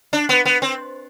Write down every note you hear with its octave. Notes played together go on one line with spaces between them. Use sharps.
D4
B3
B3
C4